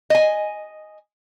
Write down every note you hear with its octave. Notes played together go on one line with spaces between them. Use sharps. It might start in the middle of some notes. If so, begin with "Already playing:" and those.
D#5 G#5